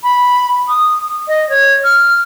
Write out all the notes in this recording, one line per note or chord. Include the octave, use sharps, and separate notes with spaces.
B5
D#6
D#5
C#5
F6